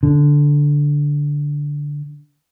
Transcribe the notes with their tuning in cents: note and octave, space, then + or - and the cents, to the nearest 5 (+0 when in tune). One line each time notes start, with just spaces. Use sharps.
D3 -10